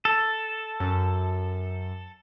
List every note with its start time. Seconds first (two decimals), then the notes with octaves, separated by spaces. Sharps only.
0.05 A4
0.80 F#2